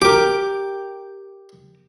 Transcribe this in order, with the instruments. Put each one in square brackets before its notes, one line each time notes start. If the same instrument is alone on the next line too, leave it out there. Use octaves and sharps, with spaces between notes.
[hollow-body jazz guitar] G4 A#4 [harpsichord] D6